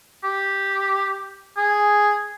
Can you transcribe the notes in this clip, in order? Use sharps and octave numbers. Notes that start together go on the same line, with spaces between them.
G4
G#4